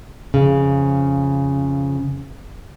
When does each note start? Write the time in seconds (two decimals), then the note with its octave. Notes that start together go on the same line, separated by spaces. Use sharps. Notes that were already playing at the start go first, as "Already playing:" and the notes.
0.34 F2 C#3